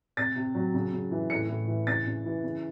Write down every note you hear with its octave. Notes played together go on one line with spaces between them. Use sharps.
C3 A6
C3
F#3
C#3
C#3
E3
A2 C#7
A2
E3
C#3 A6
C#3
E3
C#3